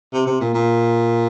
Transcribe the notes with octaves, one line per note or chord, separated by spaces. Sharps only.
C3
C3
A#2
A#2